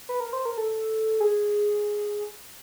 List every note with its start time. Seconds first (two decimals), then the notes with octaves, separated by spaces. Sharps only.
0.09 B4
0.20 A#4
0.33 C5
0.45 A#4
0.58 A4
1.20 G#4